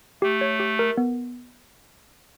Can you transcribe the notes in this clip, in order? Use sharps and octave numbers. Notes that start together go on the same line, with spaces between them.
A3 G4
C#5
G4
A#4
B3